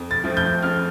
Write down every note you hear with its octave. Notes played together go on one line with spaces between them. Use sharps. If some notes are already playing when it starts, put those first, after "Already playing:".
Already playing: F2
A6
F3 A3 C4
G6
F2 F6